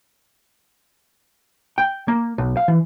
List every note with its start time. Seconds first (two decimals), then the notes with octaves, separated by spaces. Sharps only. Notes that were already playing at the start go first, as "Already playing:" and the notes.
1.78 G5
2.08 A#3
2.38 B1
2.57 F5
2.68 E3